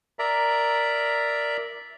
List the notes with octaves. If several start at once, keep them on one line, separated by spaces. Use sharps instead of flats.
A#4 D5 E5 A#5